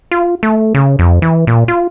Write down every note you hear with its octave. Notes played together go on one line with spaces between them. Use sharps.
F4
A3
C#3
F2
E3
A#2
F4